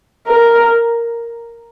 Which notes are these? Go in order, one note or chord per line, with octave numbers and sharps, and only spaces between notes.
A#4